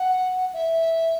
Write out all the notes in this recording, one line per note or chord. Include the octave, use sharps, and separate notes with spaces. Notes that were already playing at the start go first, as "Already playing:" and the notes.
Already playing: F#5
E5